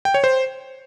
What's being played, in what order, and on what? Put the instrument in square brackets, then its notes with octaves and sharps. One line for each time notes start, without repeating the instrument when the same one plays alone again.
[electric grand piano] G5
C#5
C5